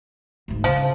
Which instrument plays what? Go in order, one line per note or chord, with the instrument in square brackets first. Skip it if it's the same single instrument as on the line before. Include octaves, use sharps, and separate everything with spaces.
[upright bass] D2 G#2
[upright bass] C#3 [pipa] F3